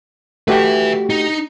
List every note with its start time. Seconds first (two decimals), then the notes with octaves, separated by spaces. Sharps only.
0.48 A3 F#4 G4 B4 E5
1.10 D#4